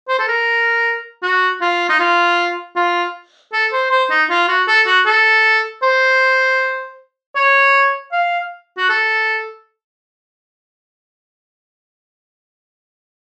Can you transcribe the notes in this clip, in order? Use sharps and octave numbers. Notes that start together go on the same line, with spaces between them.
C5
A4
A#4
F#4
F4
D#4
F4
F4
A4
C5
C5
D#4
F4
F#4
A4
F#4
A4
C5
C#5
F5
F#4
A4